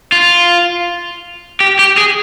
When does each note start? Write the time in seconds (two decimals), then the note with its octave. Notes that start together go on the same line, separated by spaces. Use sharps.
0.12 F4
1.60 G4
1.79 G4
1.97 G#4